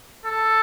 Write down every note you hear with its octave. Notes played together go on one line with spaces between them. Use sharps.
A4